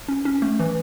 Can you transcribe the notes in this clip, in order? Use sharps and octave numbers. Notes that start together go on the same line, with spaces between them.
C#4
C#4
A3
E3